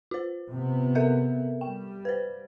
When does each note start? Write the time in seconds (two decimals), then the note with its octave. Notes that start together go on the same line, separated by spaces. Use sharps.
0.11 F4 C5
0.50 C3 B3
0.95 A4 A#4 E5
1.61 G3 G5
2.05 B4 C5